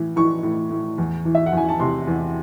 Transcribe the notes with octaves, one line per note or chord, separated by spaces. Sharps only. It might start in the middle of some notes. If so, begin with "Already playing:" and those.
Already playing: A2 E3
E3 C#6
A2
A2
E2
E3
E5
F#5
E2 G#5
A5
C3 C6
E2